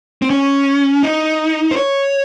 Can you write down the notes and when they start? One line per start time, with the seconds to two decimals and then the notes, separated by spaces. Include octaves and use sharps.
0.22 C4
0.30 C#4
1.03 D#4
1.71 C5
1.76 C#5